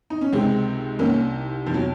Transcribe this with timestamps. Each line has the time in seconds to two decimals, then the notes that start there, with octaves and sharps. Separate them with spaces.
0.10 D#4
0.21 C#4
0.32 C#2 C3 D#3 G#3 C4
0.99 C2 C3 D#3 A#3 C#4
1.66 F2 C3 D#3 F3
1.74 F#3